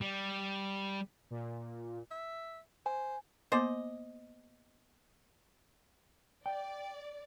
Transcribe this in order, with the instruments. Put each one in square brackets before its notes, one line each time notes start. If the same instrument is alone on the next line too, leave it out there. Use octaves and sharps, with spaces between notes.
[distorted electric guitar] G3
[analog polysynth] A#2
[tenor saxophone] E5
[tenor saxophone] C5 [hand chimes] G#5
[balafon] A#3 B3 D6 [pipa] C5 D#5
[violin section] D5 [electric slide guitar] G5